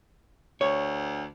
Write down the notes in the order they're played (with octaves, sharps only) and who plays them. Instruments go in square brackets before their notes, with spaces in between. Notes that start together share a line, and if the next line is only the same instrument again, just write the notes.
[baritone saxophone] D2 [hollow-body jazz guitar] C#5